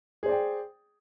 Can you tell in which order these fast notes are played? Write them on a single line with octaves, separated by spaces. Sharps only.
G#4 C5 D5 G5